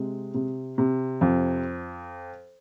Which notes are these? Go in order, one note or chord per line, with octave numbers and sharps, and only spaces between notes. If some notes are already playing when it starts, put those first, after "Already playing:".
Already playing: C3 G#3
C3
C3
F2